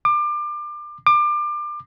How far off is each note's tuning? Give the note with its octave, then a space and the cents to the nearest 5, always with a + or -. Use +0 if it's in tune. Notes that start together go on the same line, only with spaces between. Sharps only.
D6 +30
D6 +30